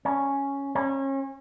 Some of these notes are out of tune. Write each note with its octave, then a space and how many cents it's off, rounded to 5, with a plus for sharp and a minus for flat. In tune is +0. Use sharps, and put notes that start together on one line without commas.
C#4 +0
C#4 -30